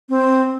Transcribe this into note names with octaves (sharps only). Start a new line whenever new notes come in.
C4